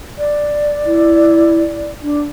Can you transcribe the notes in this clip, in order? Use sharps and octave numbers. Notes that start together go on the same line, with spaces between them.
D5
E4
D4